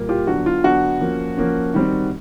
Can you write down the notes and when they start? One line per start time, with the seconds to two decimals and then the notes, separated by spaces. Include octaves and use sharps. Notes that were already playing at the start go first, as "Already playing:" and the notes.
Already playing: A#2 G3 A#3
0.09 F4 G4
0.27 D3 F#3 B3 D4 F#4
0.46 F4
0.64 D3 F#3 B3 D4 F#4
1.01 F3 A#3 C#4
1.37 F3 A#3 C#4
1.74 D#3 G3 C4